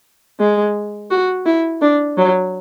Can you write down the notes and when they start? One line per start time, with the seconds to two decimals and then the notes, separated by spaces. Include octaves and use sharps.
0.40 G#3
1.11 F#4
1.46 E4
1.82 D4
2.18 F#3